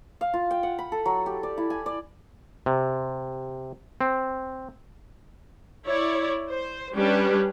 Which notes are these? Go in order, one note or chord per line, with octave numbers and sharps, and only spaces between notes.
F5
F4
G5
F#5
B5
A4
F#3
G4
D5
E4
G#5
D5
C3
C4
E4 C#5 D5
C5
G3 C#4 D4 G4 B4